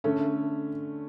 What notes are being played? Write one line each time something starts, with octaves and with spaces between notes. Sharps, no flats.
D3 A3 C#4